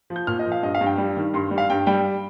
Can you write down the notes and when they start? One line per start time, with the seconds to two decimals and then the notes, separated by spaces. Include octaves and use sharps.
0.10 F3
0.16 G6
0.27 A#2 F6
0.39 D#5
0.46 F3
0.52 F5
0.63 G2 D#5
0.75 F5
0.81 G2
0.86 G5
0.98 G3
1.17 D#3
1.34 G2 C6
1.51 G3
1.58 F5
1.70 G2 G5
1.86 G3 G5